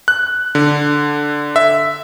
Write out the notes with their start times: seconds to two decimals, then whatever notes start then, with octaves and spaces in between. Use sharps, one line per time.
0.08 F#6
0.55 D3
1.56 E5